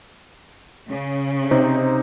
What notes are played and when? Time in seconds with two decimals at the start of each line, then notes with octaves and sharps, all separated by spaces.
0.88 C#3
1.51 C3 D#4 C5